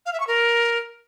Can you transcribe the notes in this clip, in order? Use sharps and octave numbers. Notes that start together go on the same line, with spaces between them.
F5
E5
C#6
A#4